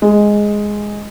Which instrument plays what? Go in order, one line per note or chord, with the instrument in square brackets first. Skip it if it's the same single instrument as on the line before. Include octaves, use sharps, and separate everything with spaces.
[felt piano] G#3